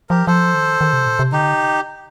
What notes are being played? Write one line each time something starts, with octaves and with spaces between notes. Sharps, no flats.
F3 G4 A#4
F3 A4 C5
D#3
D#3
C3
A#2
C3
D3 D#4 G4